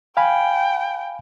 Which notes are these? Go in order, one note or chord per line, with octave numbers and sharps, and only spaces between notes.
F5 G5 G#5 B5